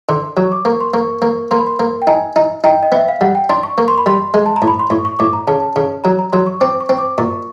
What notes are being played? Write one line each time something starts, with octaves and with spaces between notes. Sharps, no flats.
D3 C6
F#3 C#6
D6
A#3 C#6
C6
A#3 C#6
A#3
A#3 C6
B5
C6
A#3
G5
D#4 G#5
D#4
D#4 G5
D#5
B3 E5
F5
G3 F#5
G5
D4 C6
C#6
A#3 C#6
C6
B5
G3 C6
G#3
A5
A#5
A2
B5
C6
A2 C#6
C#6
A2 D6
A#5
C#3 A5
C#3
F#3 A#5
A#5
F#3 C6
C#6
C4 D6
C#6
C4
D6
A#2 C#6